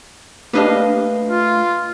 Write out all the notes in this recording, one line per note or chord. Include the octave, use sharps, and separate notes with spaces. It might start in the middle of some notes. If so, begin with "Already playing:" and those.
A3 A#3 D4 G4 B4 D#5 F5
F4